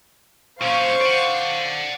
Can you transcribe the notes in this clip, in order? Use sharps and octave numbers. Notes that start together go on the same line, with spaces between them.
A#2 C#4 C5 F5 C#6
D5 F#5